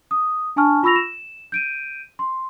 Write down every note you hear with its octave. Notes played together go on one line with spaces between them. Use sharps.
D#6
D4 G#5 A5 C#6 F6
F4 B5 C#6 E6 A#6 F7
E7
G6 D7 D#7
C6